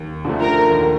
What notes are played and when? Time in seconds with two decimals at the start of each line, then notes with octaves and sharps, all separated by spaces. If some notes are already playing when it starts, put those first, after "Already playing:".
Already playing: D#2
0.25 D3 F3 A3
0.40 A#4
0.71 D#2